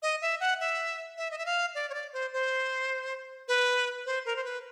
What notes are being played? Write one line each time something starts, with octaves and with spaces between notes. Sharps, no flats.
D#5
E5
F#5
E5
E5
D#5
E5
F5
D5
C#5
D5
C5
C5
B4
C5
A#4
C5
B4